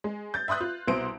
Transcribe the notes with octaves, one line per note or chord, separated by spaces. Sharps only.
G#3
G6 A6
E5 B5 C6 D#6 F#6
F4
C2 B2 C5 C6 D7